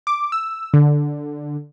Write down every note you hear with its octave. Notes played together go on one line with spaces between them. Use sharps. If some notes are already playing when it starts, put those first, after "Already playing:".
D6
E6
D3